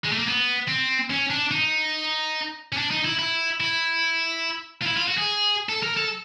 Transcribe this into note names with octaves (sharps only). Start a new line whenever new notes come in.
G#3
A3
A#3
B3
C4
C#4
D4
D#4
C#4
D4
D#4
E4
E4
E4
F4
E4
F4
F#4
G#4
A4
A#4
A4